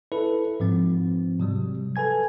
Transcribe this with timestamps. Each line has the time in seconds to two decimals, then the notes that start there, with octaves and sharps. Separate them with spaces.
0.12 E4 A4 B4
0.60 G#2 F3 C4
1.40 C3 F#3 G3
1.96 A4 B4 G#5 G#6